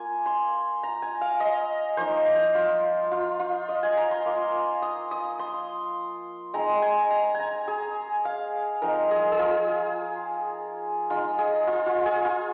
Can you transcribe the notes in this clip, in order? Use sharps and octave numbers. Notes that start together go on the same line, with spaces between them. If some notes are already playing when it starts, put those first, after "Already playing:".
Already playing: A#3 F4 G#5
C6
A#5
G#5
F5
D#5
F3 A#3 D#4 C5
F4
F4
F4
D#5
G#5
A#5
C6
A#3 F4
D#6
D#6
C6
G#3 C4 D#4 A#5
G#5
A#5
G#5 A#5
G#4
F5
F3 C4 D#4 A#4
G#4
G#4
F4
G#4
G#3 D#4 F4
G#4
F4
F4
G#4
F4